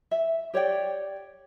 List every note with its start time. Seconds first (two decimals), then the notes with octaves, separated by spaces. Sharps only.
0.11 E5
0.54 G4 C#5 D5 G5